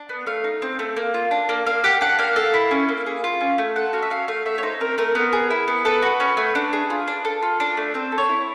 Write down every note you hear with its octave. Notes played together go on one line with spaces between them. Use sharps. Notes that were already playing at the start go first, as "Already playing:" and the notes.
Already playing: D4
B3
A3 F5
D#4
C4
A3
A#3
F4
D4
A#3
A#3 F5
G4 F#5
D4 F#5
A#3 F5
A4
E4
C#4
A#3
G#4
F4
C#4
A3
A4 F#5
F#4 F5
E5
C#4 F5
A3 F5
A3 E5
C#5
D#4 C5
C4 A#4
A3 A#4
B3
G#4
E4
B3
A4 B4
F#4
C#4
A3
D4
G#4
F4
D4
A4
F4
D4
A3
C4 C5
A4
C#5
E4